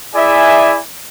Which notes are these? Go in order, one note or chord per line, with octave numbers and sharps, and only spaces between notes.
E4 G#4 D5 E5 G#5